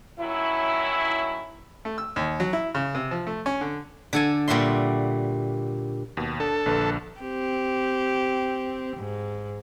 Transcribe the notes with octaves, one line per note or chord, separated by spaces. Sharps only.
D#3 F#3 C#4 E4
A3
E6
D#2
F#3
E4
C#3
C3
F3
A3
C#4
D3
D3 A4 G#5
A#2 G3 F#4 E5 C6
D#2 B2
D4 A4
A#1 D3 B4
C4 G4
G#2